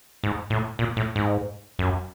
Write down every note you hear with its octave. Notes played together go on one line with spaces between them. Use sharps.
G#2
A2
A#2
A2
G#2
F#2